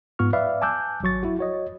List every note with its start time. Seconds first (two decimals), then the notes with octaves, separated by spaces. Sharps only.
0.19 G#2 B3 F4 C#6 F6
0.33 B4 D5 E5 F5
0.62 G#5 A5 D6 E6 F#6 G6
1.02 G#1 F#3 C#6 A6
1.23 E4 F#4
1.39 F#4 C#5 D#5